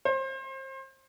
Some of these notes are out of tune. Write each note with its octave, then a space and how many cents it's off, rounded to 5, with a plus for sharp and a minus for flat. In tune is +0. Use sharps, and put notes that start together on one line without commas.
C5 +30